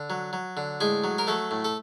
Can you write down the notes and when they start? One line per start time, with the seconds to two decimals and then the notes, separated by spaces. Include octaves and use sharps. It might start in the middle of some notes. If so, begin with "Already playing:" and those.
Already playing: D3
0.10 F#3
0.33 F#3
0.57 D3
0.81 A2 G#3 G#4
1.04 F#3
1.18 A#4
1.27 F#3 A3 A4
1.51 A2
1.65 A4